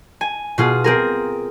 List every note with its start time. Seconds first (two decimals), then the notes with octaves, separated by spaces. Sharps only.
0.21 G#5
0.58 B2 F4 G#4
0.84 C4 G#4 A#4